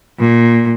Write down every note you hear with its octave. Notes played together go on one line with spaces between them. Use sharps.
A#2